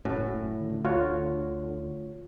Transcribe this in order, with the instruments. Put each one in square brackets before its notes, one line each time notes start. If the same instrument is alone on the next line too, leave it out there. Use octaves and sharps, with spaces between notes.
[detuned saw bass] F#1 [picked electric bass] A2 [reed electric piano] C#4 E4 F#4
[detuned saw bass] D3
[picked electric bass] D2 [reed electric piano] F4 F#4 C#5